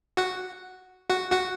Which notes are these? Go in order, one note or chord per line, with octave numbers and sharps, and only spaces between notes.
F#4 F#5
F#4 F#5
F#4 F#5